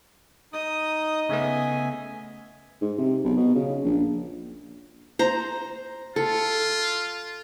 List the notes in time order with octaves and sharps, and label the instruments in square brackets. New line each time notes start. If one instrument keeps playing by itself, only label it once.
[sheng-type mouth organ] D#4 D#6 [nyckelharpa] D#5
[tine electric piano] C#3 A3 B3 [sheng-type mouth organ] G#4 E5 G#5
[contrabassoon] G#2
C3
B1
B2
C#3
A#1
[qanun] C5 A#5
[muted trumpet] F4 [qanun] A4